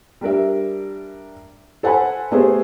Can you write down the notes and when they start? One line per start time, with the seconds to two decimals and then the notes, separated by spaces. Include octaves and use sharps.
0.21 G3 D4 A#4 E5
1.83 A4 C5 F#5 G#5 A5 B5
2.32 A3 B3 G4 G#4 C5